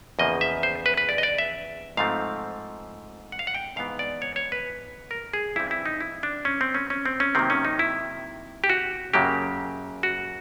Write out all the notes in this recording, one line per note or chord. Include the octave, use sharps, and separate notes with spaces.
E2 C#3 F3 A#3 D#5
E5
C5
B4
B4
D5
D#5
D5
E5
G#2 F3 A3 C4 F5
F#5
F5
F#5
G5
G#2 E3 G#3 B3 F5
D5
C#5
C#5
B4
A#4
G#4
G2 E3 G3 C4 E4
E4
D#4
E4
D4
C#4
C4
C#4
C#4
C4
C#4
C3 D#3 F#3 A#3 C4
C#4
D#4
E4
G4
F#4
F#2 C#3 F#3 A#3 G4
F#4